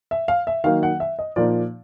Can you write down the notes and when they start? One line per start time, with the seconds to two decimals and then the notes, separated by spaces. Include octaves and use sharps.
0.11 E5
0.28 F5
0.47 E5
0.64 D#3 F#3 A#3 D#4 F5
0.83 F#5
1.00 E5
1.19 D#5
1.36 A#2 F3 A#3 D#4 D5